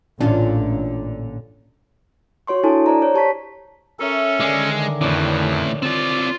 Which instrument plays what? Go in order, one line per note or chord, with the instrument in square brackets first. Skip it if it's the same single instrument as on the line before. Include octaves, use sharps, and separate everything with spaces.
[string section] A1 [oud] A#2 D3 F4 [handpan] C#4 D4
[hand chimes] F#4 C#5 C6 C#6
D4 E4 A4 G#5 A5
C5 D5 A#5
C5 C#5
G4 A5 C#6 B6
[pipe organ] C#4 A4 [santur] A#4 C#5 E5
[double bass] D3 D#3 [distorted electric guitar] G#3 [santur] D5 G#5
[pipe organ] F2 [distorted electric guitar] A2 E3 [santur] D4 C#5
[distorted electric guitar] C4 D5 [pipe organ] F4